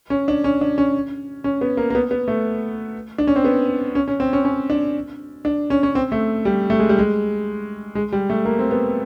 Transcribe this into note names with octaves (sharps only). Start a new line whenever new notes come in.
C#4
D4
C#4
D4
C#4
C#4
B3
A#3
A#3
B3
B3
A3
D4
C#4
C4
B3
C#4
C#4
C4
C#4
C#4
D4
D4
C#4
C#4
C4
A3
G3
A3
G#3
G3
G#3
G#3
G3
A3
A#3
C4
B3